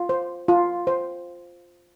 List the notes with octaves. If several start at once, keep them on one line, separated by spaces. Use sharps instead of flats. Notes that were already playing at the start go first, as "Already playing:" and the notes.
Already playing: F4
C5
F4
C5